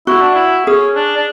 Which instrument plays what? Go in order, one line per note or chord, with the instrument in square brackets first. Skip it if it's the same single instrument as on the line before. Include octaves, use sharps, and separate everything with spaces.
[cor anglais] E4 [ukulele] F#4
[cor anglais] D4
E4
[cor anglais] C#4 [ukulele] G#4
[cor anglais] D4
D4